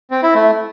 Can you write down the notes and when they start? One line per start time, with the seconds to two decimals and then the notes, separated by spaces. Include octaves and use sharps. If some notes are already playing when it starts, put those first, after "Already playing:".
0.11 C4
0.23 E4
0.35 A3